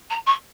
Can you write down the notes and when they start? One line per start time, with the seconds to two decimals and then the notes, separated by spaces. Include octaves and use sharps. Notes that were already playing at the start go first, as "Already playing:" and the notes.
0.10 A#5
0.26 C#6